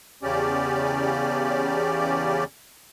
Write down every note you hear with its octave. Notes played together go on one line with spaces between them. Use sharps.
E2 C#3 C#4 G4 D5